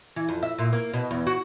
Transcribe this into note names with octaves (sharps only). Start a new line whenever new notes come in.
E3
F2
E5
A#2
A#3
B2
E2
F#4